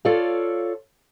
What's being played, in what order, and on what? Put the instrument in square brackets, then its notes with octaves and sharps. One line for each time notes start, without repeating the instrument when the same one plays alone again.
[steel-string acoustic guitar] F4 A4 C#5 D5 F5